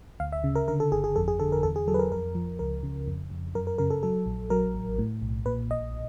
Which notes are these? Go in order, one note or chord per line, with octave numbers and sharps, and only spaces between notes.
D2 F5
E5
C#3
A#4
D3 A#4
A4
G1 G#4
G#4
F2 A4
G#4
D3 A4
A#4
E2 A4
G#4
F#3 A4
B4
A#4
F2 A#4
F3
C#2 A#4
C#3
F2
F2
F#2 A#4
A#4
C#3 A#4
A4
F#3 A4
A#1
F#3 A#4
A1
A2
B1
A#2 B4
A#1 D#5